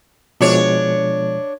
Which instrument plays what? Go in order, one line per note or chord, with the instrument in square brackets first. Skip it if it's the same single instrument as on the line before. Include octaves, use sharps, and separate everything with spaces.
[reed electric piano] B2 F3 G#3 [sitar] D4 C#5